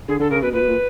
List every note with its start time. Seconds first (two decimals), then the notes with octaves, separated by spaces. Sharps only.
0.08 D3 G#4
0.19 D3 A4
0.31 C#3 A#4
0.42 B2 B4
0.53 A#2 B4
0.61 B2
0.68 A#2